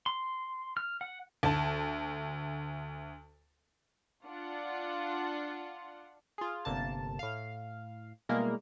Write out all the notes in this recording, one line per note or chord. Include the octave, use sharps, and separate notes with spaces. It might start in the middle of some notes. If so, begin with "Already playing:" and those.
C6
F6
F#5
D2 A5
D4 F4 F#5
F4 G#4
G1 C3 A#3 A5
A2 F5
B2 G3 G#3 A#3 E4 A#4